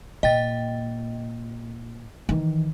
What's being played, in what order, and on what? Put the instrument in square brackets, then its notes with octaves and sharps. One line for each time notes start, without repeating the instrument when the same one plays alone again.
[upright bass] A#2 [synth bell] D#5 G5 A6
[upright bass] D#3 E3